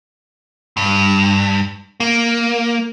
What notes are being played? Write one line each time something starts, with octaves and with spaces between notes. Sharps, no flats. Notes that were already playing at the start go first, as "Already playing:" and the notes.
G2
A#3